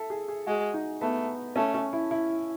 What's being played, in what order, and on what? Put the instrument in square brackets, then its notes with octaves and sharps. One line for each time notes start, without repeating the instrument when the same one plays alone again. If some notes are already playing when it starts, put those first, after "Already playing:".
Already playing: [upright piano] A4 E5
G#4
G#4
[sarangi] G#3 [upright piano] F#4
[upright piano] D#4
[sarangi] A3 [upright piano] B3
[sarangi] A3 [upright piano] C#4
[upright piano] C#4
E4
E4